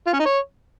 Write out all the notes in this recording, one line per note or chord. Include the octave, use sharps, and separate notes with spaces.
F4
C#4
D#4
C#5